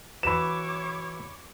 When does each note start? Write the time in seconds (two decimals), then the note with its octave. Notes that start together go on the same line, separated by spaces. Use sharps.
0.23 E3 F#4 B4 C#5 B5 D6 E7